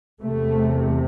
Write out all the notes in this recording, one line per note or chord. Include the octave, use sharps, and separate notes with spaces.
E2 C3 A3